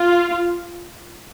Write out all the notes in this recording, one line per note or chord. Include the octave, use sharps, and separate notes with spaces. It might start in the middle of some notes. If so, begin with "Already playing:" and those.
Already playing: F4